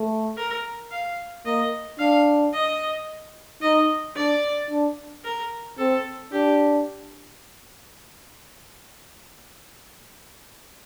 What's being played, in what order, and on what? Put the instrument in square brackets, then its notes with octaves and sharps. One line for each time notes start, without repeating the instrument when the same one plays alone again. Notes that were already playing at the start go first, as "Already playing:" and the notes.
Already playing: [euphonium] A3
[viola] A#4
F5
[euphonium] A#3 [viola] D#5
[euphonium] D4 [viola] F5
[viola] D#5
[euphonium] D#4 [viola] D#5
[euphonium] D4 [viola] D5
[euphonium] D4
[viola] A#4
[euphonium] C4 [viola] A4
[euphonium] D4 [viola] G4